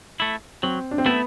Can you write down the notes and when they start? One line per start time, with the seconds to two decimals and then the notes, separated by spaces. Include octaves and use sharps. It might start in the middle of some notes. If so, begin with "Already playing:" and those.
0.20 A3 E4
0.63 F#3 C4
0.91 D4
0.98 C4
1.06 A3 B3 E4